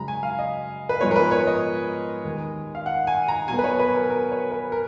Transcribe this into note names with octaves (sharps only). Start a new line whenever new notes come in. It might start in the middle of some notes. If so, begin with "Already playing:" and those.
Already playing: F#2 C#3 G#3 A#5 B5
G#5
F5
D#5
B4
G#2 F3 G#3 B3 C#5
A#4
B4
C#5
D#5
D#2 D#3 G#3
F5
F#5
G#5
A#5
B2 F#3 B3 G#5
B4
C#5
B4
A#4
A#4
C#5
B4
A#4